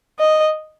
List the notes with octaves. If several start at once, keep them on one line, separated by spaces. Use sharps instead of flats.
D#5